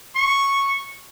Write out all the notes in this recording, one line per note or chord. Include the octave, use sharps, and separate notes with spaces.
C#6